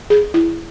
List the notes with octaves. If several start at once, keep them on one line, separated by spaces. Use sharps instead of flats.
G#4
E4